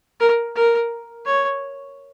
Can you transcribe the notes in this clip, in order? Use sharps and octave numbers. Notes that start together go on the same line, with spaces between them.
A#4
A#4
C#5